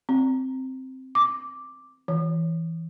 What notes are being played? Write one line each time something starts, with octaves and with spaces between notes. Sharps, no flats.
C4
D6
E3